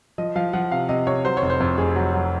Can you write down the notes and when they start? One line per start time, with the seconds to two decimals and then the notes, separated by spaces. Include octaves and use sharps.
0.18 F3 D#5
0.36 F3 F5
0.53 F3 F#5
0.71 C3 F5
0.89 C3 D#5
1.07 C3 C#5
1.24 F#3 C5
1.37 C#5
1.42 F1
1.50 C5
1.60 F2
1.78 F1 G#4
1.96 F#3
2.14 F#3